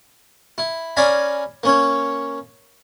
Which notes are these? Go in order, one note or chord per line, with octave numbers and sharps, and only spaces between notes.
E4
C#4 D5 F5 G#5 A#5 B5
A#3 C#4 C#5